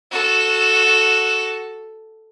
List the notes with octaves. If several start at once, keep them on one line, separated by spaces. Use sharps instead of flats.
F#4 A4